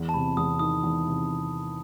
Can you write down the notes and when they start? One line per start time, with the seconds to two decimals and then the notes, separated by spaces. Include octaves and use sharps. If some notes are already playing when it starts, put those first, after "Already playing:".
Already playing: E2
0.09 A5
0.14 C3 B5
0.37 E2 D#6
0.59 D#3 D#6
0.84 E2
1.06 C3